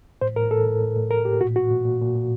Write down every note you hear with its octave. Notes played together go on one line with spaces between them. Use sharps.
A2 C5
A2 A#4
A2 A4
A2
A2
A2
A2 A#4
A2 G4
A#2 F#4
A#2 F#4
A#2
A#2
A#2
A#2